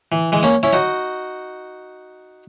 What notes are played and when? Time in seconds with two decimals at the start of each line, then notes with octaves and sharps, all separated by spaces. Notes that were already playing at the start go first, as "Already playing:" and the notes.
0.12 E3
0.32 E3 G#3
0.43 A#3 C#4
0.63 C#4 E4
0.73 D#4 F#4